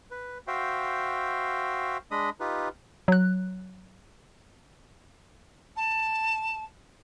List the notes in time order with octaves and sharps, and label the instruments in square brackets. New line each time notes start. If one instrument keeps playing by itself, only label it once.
[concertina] B4
F#4 C5 E5 F5 G5
G#3 D4 D#5 B5 D#6
D#4 F4 G4 B4
[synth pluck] F#3 F#6
[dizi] A5